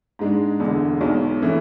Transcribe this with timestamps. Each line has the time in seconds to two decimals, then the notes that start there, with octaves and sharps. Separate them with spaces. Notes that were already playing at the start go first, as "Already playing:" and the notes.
0.19 G#2 G#3 D4
0.60 E1 E2 D3
1.01 B1 B2 G#3
1.42 E3 A3 C#4